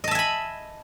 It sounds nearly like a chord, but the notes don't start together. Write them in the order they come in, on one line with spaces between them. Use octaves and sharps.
D#5 A5 E5 G#5 B5